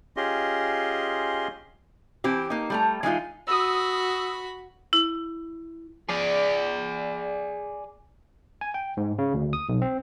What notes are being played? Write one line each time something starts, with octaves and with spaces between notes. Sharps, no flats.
C#4 F4 G4 G#4 D#5 C6
E3 C4 G4
A#3 D#4
G3 A3 A#5
E3 G#3 D#4 F4
F#4 B5 D#6 E6
E4
G#4 D5
G#5
G5
G#2
C#3
D2
D#6
B1
C4